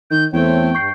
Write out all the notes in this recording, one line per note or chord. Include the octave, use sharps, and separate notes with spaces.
D#3 G6
E2 A3 C4 C#5 G5
G2 C#6 G6 C7